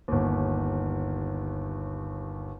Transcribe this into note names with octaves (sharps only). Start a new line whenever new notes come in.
G1 D#2